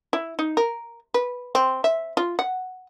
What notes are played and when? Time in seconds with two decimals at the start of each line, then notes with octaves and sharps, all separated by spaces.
0.13 E4
0.39 D#4
0.57 A#4
1.14 B4
1.55 C4
1.84 E5
2.17 F4
2.39 F#5